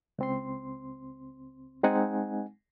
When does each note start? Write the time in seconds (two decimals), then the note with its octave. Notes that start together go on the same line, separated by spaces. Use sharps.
0.18 C#2 C4 C6
1.83 G#3 C4 D#4 F#5 G#5